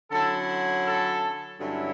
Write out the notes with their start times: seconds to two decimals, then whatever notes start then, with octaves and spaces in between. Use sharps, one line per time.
0.10 D3 F#3 C#4 E4 A4
0.84 A4
1.59 G2 D3 F#3 C#4 E4